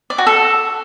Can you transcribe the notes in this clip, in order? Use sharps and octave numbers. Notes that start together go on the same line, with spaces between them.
D5
F#4
A4